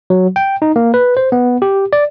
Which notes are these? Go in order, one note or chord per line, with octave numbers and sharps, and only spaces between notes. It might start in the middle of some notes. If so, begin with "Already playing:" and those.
F#3
G5
D#4
A#3
B4
C5
B3
G4
D5